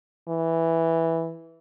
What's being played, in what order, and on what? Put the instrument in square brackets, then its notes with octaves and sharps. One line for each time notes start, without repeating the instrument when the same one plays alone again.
[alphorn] E3